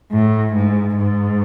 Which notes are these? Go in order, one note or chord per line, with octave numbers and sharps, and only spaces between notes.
A2
G#2
G#2